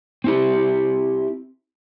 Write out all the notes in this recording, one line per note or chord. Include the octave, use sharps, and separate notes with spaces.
C4 E4 G4